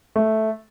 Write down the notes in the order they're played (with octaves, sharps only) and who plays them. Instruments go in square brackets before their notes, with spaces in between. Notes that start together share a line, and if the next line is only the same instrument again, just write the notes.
[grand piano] A3